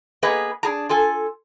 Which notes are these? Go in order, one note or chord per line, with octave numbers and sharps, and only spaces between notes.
A#3 B3 G#4 B4 D#5
D4 G#4 A#5
F4 A4 G#5